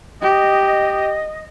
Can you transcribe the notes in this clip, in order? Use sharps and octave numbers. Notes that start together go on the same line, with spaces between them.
G4 D#5